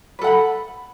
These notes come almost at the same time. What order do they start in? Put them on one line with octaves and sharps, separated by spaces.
B4 A4 F#5 B5